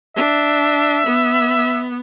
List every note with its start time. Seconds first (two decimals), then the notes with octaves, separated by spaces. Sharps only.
0.16 D4 E5
1.07 B3